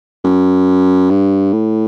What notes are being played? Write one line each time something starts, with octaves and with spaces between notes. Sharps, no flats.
F#2
G2
A2